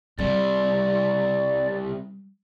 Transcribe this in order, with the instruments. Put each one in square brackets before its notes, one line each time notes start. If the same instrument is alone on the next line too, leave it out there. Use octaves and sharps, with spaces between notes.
[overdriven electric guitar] C2 C3 [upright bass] G3 [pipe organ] D5